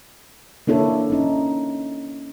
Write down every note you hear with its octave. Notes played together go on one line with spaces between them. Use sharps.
A#3 D4 E4 A4 C#5
C#4 D#4